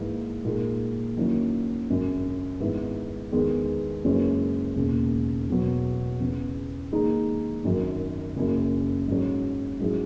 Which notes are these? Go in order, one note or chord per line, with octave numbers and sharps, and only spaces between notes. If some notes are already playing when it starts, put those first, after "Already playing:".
Already playing: G#2 E3 A#3 E4
A#2 G#3 D#4
D#2 D#3 F#3 C#4 E4
G#1 F#2 C#3
G#1 G#2 E3 B3 E4
E2 D#3 G#3
F#1 F#2 E3 G#3 C#4
E1 D#2 C#3
E1 E2 B2 F#3
E2 C#3 E3
D#2 D#3 G#3 D#4 G#4
G#1 F#2 D#3 F#3
F#1 F#2 C#3
G#2 F#3 C#4
G#2 F#3 C#4 E4 G#4